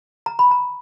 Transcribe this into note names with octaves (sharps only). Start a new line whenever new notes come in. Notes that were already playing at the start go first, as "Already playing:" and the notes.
A#5
B5
A#5